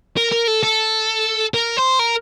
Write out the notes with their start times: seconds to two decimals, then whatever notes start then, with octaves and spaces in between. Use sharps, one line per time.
0.17 A#4
0.32 A#4
0.47 A4
0.63 A4
1.54 A#4
1.77 C5
1.99 A#4